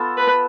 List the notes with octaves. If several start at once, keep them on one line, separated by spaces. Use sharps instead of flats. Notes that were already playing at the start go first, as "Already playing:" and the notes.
Already playing: B3 F4 A4
B4